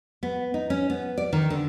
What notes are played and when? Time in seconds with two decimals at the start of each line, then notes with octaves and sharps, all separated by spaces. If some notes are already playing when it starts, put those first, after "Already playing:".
0.23 B3
0.54 D#4
0.70 C#4
0.90 B3
1.18 D5
1.33 D#3
1.50 D3